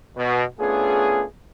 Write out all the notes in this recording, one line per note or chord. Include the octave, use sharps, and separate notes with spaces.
B2
A3 B3 C#4 D4 F4 G#4